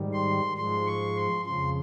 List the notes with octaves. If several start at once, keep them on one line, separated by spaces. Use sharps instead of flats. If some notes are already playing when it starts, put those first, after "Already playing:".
Already playing: G#2 D#3 G3
C6
G#2 F3 G#3 C6
C#6
C6
F2 C#3 F3 C6